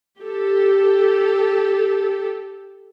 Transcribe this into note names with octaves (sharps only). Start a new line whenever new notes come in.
G4 A4